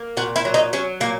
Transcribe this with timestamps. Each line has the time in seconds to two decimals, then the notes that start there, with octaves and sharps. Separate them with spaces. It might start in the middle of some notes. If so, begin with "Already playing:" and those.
Already playing: A#3
0.17 A#2 F#4
0.36 E4
0.45 F#3
0.54 D#4
0.73 F#3 C#4
1.00 A#2 A#3